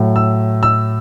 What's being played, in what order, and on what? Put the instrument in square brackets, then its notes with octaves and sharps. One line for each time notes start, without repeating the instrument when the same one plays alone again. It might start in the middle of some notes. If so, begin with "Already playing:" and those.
Already playing: [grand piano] A2 F#3
E6
E6